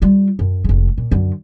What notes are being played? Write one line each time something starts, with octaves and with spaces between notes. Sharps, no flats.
G3 F4
F#2
F1 G#3
A#2
F#2 D3